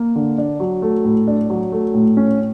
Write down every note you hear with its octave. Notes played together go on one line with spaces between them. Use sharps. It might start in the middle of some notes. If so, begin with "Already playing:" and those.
Already playing: A#3
D3
D4
F#3
A3
A2
D4
F#3
A3
A2
C#4